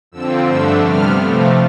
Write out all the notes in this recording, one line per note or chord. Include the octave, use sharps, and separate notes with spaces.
F2 D3 F3 C4 E6
G2 D3 A3 D4 E6
C3 G3 B3 F6
C3 F3 A3